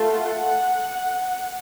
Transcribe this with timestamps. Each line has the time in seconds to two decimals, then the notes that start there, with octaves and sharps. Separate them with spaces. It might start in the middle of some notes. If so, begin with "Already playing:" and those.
Already playing: A3 F4 A4
0.10 F#5